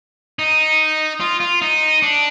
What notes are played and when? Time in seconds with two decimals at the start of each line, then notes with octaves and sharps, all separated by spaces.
0.39 D#4
1.20 F4
1.40 F4
1.62 D#4
2.03 D4